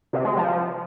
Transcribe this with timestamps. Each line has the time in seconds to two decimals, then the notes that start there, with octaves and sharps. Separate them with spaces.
0.13 C3
0.25 G#3
0.37 F3